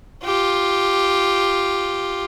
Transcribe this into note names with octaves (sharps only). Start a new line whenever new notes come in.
F4 G4